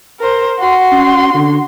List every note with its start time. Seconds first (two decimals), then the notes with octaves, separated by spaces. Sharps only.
0.20 A#4 C5
0.59 F#4 C6
0.92 C#4
1.34 D3